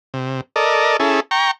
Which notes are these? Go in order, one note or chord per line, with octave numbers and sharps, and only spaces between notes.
C3
A4 A#4 D5 D#5
C#4 E4 G#4 A4
G5 A#5 C#6